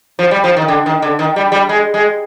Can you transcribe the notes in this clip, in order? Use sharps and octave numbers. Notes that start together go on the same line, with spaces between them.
F3
G3
F3
D#3
D3
D#3
D3
D#3
G3
G3
G#3
G#3